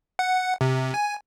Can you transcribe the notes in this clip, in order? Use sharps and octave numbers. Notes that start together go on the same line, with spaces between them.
F#5
C3
G#5